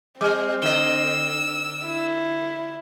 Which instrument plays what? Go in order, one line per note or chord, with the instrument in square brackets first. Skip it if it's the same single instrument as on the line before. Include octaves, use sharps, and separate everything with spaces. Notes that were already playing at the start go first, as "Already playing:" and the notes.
[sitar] G3 [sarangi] C4 [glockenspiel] D6 F6
[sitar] D3 D#5 [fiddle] E6 [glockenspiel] G7
[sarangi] E4